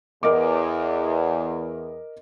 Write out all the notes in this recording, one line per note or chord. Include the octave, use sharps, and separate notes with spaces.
E2 A#4 D#5 D6